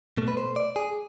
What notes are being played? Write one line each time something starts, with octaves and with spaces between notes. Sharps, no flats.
B2 A3
B4
C5
D5
G#4